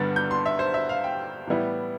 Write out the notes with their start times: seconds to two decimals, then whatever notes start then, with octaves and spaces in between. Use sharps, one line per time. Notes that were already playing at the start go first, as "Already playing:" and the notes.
Already playing: G2 D3 G3 B3 D4 A6
0.16 G6
0.31 C6
0.46 E5
0.59 C5
0.74 E5
0.89 F5
1.04 G5
1.47 A2 E3 G3 B3 E4